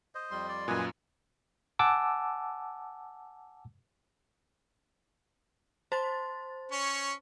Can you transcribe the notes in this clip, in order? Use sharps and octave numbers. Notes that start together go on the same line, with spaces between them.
C5 D#5
F2 G3 C6
D5
F#2 A#2 B4 D#5 G#5
F#5 G#5 A5 D6 E6
C5 A5 C6 A6
C#4 C#5